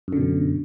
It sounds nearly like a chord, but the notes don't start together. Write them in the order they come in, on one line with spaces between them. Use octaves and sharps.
F#2 D3 B2